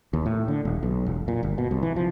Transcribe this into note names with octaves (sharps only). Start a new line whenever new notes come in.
D#2
A2
D3
D#1
B1
E1
A#2
G1
B2
C2
E3
F3